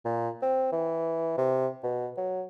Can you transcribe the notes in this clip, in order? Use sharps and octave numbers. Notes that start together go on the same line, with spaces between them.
A#2
C4
E3
C3
B2
F#3